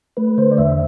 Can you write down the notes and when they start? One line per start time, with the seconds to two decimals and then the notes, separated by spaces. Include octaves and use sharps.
0.17 A3 B4
0.38 D3 C5
0.51 D5
0.58 E2 E5